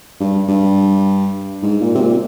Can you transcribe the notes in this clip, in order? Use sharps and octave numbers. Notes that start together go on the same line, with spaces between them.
G2
G2
G#2
A#2
C3
A#2